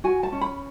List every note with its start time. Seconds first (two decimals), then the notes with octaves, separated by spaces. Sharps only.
0.04 F#4 G#5
0.23 A5
0.32 C#4
0.41 B5